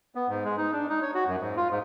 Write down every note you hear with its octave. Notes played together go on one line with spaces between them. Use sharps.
B3
G#2
G#3
D#4
D4
D#4
C#5
F#4
F#2
G#2
F4
G#2